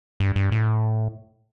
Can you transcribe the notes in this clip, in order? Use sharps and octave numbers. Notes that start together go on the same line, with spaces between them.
G2
G2
A2